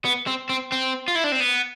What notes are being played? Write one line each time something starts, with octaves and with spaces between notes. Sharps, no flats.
B3
C4
C4
C4
F4
E4
D4
C4
B3